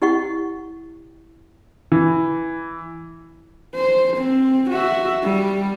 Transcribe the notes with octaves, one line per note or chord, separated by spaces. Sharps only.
E4 G4 D#5 F#5 C#6
E3
C5
C4
F#4 E5
G3